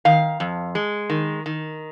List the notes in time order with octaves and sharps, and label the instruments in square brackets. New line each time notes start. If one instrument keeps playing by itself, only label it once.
[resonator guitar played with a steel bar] D#3 F5
F2
G#3
D#3
D#3